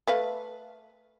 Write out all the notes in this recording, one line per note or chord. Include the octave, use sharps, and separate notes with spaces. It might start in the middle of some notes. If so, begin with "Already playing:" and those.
A3 B4 F5